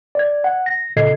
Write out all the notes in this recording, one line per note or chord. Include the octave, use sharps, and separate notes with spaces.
D5 G#6
F#5
A#6
A#2 C#3 A4 D#5 G#6 C7